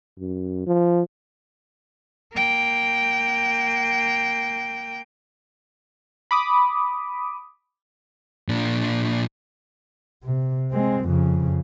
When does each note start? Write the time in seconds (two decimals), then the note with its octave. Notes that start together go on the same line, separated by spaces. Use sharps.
0.19 F#2
0.67 F3
2.34 A#3 G5
6.31 B5 D6 D#6
8.49 A#2 D4
10.24 C3
10.72 G#3 C4
11.05 F2 C#3